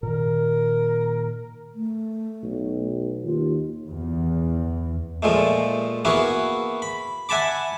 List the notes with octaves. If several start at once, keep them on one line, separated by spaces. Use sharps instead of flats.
A#2 D#3 A#4
A3
B1
D#2 F4
E2
A#2 F3 G#3 A3
A#3 B3 E4 F#4 G#4
B5
E5 F#5 G#5 A5 B5 D6